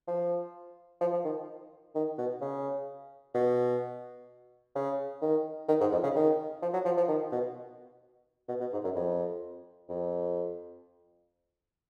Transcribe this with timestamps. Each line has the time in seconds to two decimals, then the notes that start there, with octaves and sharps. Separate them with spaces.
0.08 F3
1.01 F3
1.13 F3
1.25 D#3
1.95 D#3
2.18 B2
2.41 C#3
3.35 B2
4.76 C#3
5.22 D#3
5.69 D#3
5.81 G#2
5.92 F2
6.03 C#3
6.16 D#3
6.62 F3
6.73 F#3
6.85 F3
6.97 F3
7.08 D#3
7.32 B2
8.48 B2
8.60 B2
8.73 G#2
8.84 F#2
8.96 F2
9.89 F2